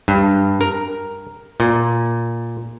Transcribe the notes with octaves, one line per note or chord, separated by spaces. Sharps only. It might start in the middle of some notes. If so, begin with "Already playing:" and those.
G2
A#4
A#2